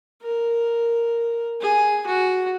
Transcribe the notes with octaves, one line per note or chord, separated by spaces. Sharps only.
A#4
G#4
F#4